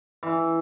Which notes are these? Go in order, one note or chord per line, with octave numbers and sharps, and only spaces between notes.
E3